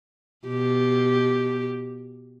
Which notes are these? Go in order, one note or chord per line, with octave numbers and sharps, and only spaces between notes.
B2 G4